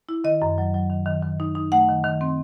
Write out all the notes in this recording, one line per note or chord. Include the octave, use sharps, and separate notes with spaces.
E4
D#3 D#5
F#2
F#3
F#3
D#3
D#3
D#3
D#4
D#4
A3 F#5
D#3
D#3
C4